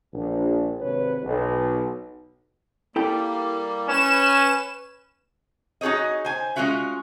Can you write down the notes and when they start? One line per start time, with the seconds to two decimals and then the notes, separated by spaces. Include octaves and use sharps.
0.13 A#1
0.80 G#1 C3 B4 C#5
1.22 B1
2.96 G3 A#3 E4 A4 G5
3.88 C#4 B4 E7
5.81 D#4 F#4 G#4 C#5 D#5
6.25 C5 G#5
6.56 G#3 A#3 C#4 F4 F#4 E5